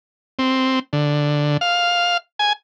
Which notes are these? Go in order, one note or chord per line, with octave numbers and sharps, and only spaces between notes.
C4
D3
F5
G#5